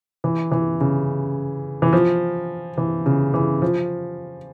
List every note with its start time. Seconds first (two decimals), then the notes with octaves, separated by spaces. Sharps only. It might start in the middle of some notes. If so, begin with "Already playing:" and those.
0.24 E3
0.51 E3
0.81 C#3
1.82 E3
1.93 F3
2.78 E3
3.06 C#3
3.34 E3
3.62 F3